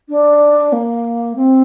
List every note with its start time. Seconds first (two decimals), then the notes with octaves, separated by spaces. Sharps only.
0.09 D4
0.72 A#3
1.36 C4